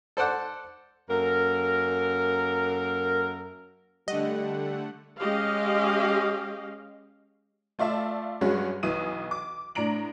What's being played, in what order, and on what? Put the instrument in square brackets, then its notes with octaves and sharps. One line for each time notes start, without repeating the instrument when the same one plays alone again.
[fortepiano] A4 C5 D5 F#5
[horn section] F#2 A#3 A4 A#4
[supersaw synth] D3 A3 F#5 [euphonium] G3 [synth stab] D#5
[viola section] G#3 C#4 G4 D#5 F5
[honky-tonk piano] A3 F4 D5 E5 A5
G2 F#3 G#3 C#4 F#4
B1 E3 D#6 D#7
D6
A2 D4 A#5 D7 F#7